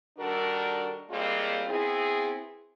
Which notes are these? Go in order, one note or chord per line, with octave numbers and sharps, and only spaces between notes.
D#3 G3 D4 F#4 A4 A#4
A2 G3 G#3 A#3 C4 F4
B3 C4 E4 G#4